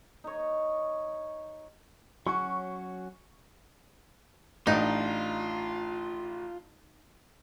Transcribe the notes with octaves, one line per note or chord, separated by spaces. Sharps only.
D#4 C#5
F#3 C#4 F#4 C#6
A1 D4 D#4 F4